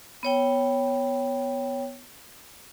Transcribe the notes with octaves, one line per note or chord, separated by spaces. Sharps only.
B3 C#5 G5